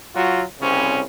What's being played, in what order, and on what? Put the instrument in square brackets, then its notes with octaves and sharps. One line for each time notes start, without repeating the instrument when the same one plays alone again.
[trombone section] F#3 F4 F#4
C2 C#3 C4 C#4